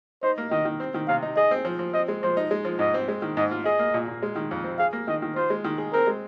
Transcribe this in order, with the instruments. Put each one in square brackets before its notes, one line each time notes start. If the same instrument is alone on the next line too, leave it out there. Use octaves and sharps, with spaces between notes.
[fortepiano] D#4 [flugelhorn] C5
[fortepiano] A#3
[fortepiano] D#3 [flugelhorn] D#5
[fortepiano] D#3
C4
D#3
[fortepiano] C3 [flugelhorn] F5
[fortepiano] D#4
[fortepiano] G#4 [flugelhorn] D#5
[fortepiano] C4
F3
F3
[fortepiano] C4 [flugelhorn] D#5
[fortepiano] G#3
[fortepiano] F3 [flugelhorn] C5
[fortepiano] D#4
G#3
F3
[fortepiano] G#2 [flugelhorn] D#5
[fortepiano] C4
G#3
D#3
[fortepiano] G#2 [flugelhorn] D#5
[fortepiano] F4
[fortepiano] G#4 [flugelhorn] D#5
[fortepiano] A#3
A#2
A#2
G#3
D#3
F2
C4
[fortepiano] G#4 [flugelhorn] F5
[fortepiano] A#3
[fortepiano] D#3 [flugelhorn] D#5
[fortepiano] D#3
[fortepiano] F4 [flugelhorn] C5
[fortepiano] G#3
D#3
G#4
[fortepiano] C4 [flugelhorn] A#4
[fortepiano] G#3